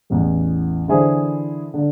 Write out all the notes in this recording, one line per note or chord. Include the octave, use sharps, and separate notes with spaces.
A1 E2
D3 E3 E4 G#4 C5
D3